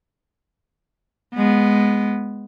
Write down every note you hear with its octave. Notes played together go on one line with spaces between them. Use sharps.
G#3 B3